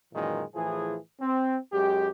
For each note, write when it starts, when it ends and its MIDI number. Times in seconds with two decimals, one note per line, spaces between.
0.13 0.43 42
0.13 0.43 46
0.13 0.43 51
0.13 0.43 52
0.13 0.43 56
0.55 0.97 45
0.55 0.97 52
0.55 0.97 53
0.55 0.97 68
1.21 1.57 60
1.73 2.09 42
1.73 2.09 56
1.73 2.09 67